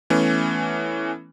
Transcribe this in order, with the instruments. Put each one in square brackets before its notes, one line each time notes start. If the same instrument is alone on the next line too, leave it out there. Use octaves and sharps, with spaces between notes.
[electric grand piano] E3 A3 B3 C#4